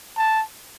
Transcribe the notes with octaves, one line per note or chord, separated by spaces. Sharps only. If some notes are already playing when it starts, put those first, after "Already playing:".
A5